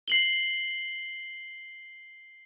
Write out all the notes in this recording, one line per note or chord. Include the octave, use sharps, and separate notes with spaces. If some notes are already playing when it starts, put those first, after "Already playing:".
C7 F#7 G7